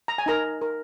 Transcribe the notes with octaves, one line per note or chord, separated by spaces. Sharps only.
A#5
G#5
D#4 A#4 A#5
A#4